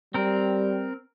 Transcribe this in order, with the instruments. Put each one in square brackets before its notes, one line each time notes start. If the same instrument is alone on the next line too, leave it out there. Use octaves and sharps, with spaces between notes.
[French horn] G3 [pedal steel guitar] C4 A#4